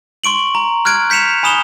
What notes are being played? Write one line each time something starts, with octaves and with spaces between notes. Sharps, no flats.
C6 C#6 D7 F#7
A#5
F6 F#6 G#6 D7
G6 B6 C#7 E7 F7
G#5 B5 D#6 E7 F7 G7